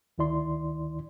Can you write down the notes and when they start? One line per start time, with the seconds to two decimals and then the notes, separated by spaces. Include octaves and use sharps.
0.18 D2 D#3 E4 D5 C6